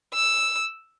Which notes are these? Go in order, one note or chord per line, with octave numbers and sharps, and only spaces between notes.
E6